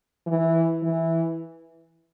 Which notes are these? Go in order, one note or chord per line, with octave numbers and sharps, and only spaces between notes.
E3
E3